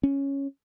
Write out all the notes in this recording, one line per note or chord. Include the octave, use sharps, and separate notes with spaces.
C#4